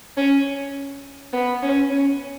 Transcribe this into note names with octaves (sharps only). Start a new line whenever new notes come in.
C#4
B3
C#4
C#4